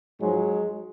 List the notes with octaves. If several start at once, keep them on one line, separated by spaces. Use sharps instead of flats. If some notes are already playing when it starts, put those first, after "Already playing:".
G#2 F3 F#3 G#3